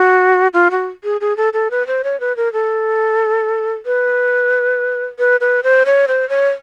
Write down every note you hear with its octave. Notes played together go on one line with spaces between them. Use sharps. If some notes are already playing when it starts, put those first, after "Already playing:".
Already playing: F#4
F4
F#4
G#4
G#4
A4
A4
B4
C5
C#5
B4
A#4
A4
B4
B4
B4
C5
C#5
C5
C#5